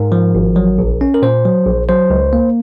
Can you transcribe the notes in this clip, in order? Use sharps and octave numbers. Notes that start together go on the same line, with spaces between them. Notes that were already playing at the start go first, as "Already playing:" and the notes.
Already playing: G#2 A#4
F3
G#1
F#3
A#1
C#4
A#4
A#2 C5
F#3
A#1
F#3 C5
C#2
A#3